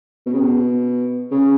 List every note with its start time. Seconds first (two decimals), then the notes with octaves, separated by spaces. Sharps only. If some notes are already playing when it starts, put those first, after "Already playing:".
0.26 B2
0.33 C#3
0.42 B2
1.32 C#3